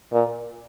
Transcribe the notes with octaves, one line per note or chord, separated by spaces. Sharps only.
A#2